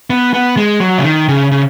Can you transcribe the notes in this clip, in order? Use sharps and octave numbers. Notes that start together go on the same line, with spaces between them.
B3
B3
G#3
F#3
C#3
D#3
C#3
C#3